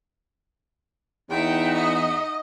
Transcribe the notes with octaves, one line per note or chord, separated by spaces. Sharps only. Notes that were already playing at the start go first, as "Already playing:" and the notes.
E2 D#4 E5 F#5 G5
D#5